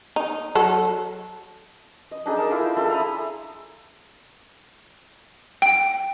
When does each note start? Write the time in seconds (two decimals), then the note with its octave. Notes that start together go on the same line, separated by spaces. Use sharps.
0.16 D#4
0.55 F#3 A4
2.11 D#5
2.26 D4 D#4 G#4 A4
2.37 A#4 A5
2.51 E4 F4 A#4 C5
2.77 G#4 A4 E5 C6
2.90 A#5 B5 D#6
5.62 G5